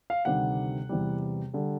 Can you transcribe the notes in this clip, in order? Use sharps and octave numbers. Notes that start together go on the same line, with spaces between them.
F5
D2 C3 D#3 G3 F#5
E2 C3 E3 G3
D3 G3